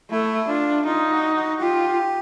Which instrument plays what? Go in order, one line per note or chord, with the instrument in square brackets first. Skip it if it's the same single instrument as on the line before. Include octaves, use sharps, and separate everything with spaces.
[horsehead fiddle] A3 [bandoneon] E4
[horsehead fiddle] D4 [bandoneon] F4
[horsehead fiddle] D#4 [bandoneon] F4
[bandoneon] F#4
F#4
[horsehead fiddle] F4 [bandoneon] G4